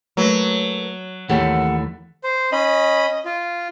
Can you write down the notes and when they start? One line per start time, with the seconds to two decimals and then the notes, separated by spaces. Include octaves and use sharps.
0.17 F#3 A3 A#3 B4
1.29 D#2 E3 A3 A#3 G4 C#5 F#5
2.24 C5
2.52 C#4 D#5 B5
3.25 F4